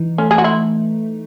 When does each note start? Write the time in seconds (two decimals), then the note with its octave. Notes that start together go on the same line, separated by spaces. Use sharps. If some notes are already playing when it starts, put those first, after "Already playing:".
Already playing: E3 D#4
0.18 A3 C#4
0.31 G#4
0.38 F#4
0.44 E4